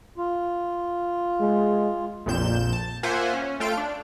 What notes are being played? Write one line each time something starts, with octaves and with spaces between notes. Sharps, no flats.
F4
G#3
A#1 F2 A#2 G6 E7
A5
A#3 F4 C5 E5 F#5 G#5
C#4
A3 F4 A4 F5 G5 D7
D4